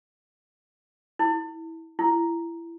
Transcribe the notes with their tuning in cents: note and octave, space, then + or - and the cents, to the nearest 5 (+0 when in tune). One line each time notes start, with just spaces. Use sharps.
E4 -20
E4 +25